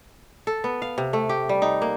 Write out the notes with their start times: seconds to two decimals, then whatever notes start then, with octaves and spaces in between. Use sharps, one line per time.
0.47 A4
0.64 B3
0.82 F5
0.98 C3
1.13 A3
1.29 G4
1.49 G3
1.62 D#4
1.82 A#3